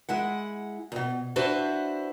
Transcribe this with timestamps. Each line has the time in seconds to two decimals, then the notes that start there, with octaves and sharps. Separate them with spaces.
0.09 G#3 E4 F#5
0.92 E2 B2
1.36 D4 E4 F#4 B4 C5